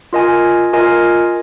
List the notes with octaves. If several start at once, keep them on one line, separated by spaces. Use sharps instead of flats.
F4 A#4 D#5 G#5
F4 A#4 D#5 G#5